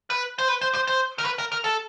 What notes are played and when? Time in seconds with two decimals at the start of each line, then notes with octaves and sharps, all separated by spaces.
0.10 B4
0.38 C5
0.48 B4
0.61 C5
0.74 C5
0.87 C5
1.18 A#4
1.25 B4
1.38 A#4
1.52 A#4
1.64 A4